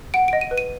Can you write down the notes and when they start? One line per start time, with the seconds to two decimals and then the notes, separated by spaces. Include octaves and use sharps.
0.14 F#5 D7
0.28 D#5 D7
0.41 D#7
0.51 B4
0.58 D#7